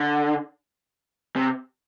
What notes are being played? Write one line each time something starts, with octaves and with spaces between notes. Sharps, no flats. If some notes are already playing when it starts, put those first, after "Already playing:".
Already playing: D3
C3